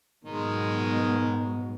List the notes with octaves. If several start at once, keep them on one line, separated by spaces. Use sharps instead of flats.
G#2 B2 D#3 F#3 G#3